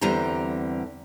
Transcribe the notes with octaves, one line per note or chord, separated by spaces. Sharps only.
E2 D3 G3 C4 A#5